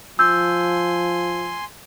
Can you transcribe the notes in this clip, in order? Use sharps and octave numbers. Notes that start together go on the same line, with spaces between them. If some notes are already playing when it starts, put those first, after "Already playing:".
F3 G#5 C6 E6 G6